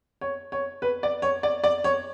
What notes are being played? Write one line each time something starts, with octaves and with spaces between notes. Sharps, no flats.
C#5
C#5
B4
D5
C#5
D5
D5
C#5